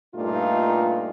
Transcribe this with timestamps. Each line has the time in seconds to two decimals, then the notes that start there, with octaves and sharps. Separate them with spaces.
0.14 G2 A#2 A3 D#4 F4